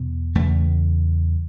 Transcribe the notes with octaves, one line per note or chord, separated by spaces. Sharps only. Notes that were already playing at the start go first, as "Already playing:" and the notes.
Already playing: E2 B2
E2 C#3 A3